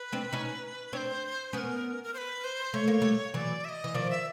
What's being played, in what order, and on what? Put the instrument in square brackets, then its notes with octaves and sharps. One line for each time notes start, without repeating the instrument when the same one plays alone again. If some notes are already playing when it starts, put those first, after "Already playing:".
Already playing: [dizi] B4
[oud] C4 D4
C#4 D#4
[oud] C4 D4 [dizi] C#5
[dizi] C5
[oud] B3 C#4 [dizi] A#4 B4
[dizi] A#4
C5
B4
C5
[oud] A3 [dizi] C#5
[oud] A#3
G3 A3
[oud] E3 F#3 [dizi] D5
[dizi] E5
D#5
[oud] E3
[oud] D#3 F3 [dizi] D5
[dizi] E5